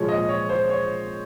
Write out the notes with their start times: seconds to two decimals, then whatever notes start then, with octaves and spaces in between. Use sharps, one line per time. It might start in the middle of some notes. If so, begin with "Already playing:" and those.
Already playing: A#2 F3 G#3 C#5
0.09 D#5
0.29 C#5
0.49 C5
0.69 C#5